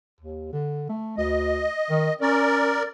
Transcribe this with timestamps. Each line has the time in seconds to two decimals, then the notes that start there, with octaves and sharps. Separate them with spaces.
0.21 D#2
0.52 D3
0.89 A3
1.18 D2 D#5
1.90 D#3
2.21 C#4 A#4 D5